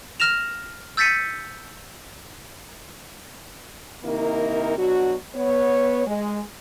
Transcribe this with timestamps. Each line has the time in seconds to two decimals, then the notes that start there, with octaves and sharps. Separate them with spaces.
0.20 F6 A#6 E7 F7
0.97 E6 G6 A6 B6 C#7 D#7
4.04 C3 D#3 A#3 D#4 E4 A#4
4.77 B2 F#3 D4 F#4
5.35 B3 C#5
6.06 G#3